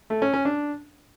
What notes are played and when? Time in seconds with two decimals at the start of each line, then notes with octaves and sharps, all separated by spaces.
0.10 A3
0.22 C#4
0.34 C#4
0.45 D4